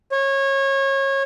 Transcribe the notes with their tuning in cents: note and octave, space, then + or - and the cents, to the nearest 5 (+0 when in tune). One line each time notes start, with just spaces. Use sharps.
C#5 -25